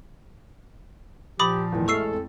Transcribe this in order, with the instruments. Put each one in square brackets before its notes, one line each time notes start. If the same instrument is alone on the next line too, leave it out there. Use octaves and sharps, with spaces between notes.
[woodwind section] A#2 F3 [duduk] G4 [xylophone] B5 D6 D#6 [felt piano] A6
[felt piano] E2 A2 E3 [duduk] D#3
[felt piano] A1 G#3 [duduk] A4 [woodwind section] E5 F6 [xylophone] C#6 E6 C7
[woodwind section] F2